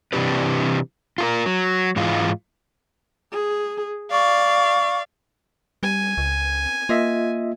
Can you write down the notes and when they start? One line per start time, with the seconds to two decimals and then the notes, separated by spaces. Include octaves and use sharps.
0.13 C3 E3 D4 D#4 G4 B4
1.18 F4 A4 A#4
1.46 F#3
1.96 G#2 E3 G#3 F4
3.32 G#4
4.11 D5 F5 C#6
5.83 G3 G#5
6.18 C#2
6.89 A#3 F4 D#5 E5